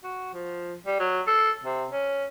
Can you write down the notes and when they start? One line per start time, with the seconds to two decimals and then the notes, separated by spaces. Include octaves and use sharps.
0.04 F#4
0.34 F3
0.86 G3
1.00 F#3
1.27 A4
1.64 C3
1.91 C#4